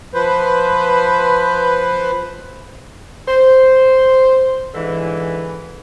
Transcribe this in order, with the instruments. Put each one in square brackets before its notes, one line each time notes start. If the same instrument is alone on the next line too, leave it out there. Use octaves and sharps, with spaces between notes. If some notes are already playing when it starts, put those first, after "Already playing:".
[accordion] F3 B4 C5
[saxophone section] C5
G#2 D3 E3